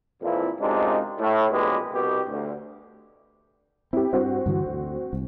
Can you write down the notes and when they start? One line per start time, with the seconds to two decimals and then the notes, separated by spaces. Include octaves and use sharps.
0.22 F2 A#2 E3 F3 C4 E4
0.60 F#2 C3 G#3 D4 D#4 F4
1.18 A2
1.50 B1 F2 A#2 G#3 G4 B4
1.92 C2 B2 G4
2.28 D2
3.93 C4 E4 G4
4.13 G2 C4 F#4 C5
4.46 G2 D3 E3
4.66 D2
5.13 C2